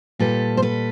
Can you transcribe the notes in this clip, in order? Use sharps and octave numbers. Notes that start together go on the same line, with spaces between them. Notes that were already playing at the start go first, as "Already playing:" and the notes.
A#2 G3 A4 B4
C5
A4 B4